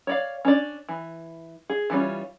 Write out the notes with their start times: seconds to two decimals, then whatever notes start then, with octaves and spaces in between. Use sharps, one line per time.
0.07 C#5 D5 F5
0.45 C#4 D4 D5
0.89 E3
1.70 G#4
1.90 E3 G3 C#4 F4